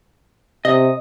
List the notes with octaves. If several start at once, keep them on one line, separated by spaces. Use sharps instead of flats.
C3 D#5